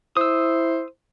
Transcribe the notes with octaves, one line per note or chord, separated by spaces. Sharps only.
E4 C5 D#6 E6